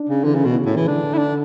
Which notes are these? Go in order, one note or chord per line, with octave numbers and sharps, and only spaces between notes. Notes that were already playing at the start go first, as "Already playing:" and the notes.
Already playing: D4
C#3
D3 E3
C#3
B2
C#3
A2
E3
D3 D4
E4
D4